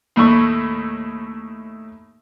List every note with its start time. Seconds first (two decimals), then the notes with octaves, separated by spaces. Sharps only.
0.16 D#2 A2 A3 C#6